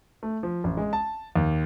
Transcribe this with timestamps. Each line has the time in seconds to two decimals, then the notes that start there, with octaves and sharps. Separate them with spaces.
0.23 A3
0.43 F3
0.64 A1
0.77 G#3
0.93 A5
1.36 D#2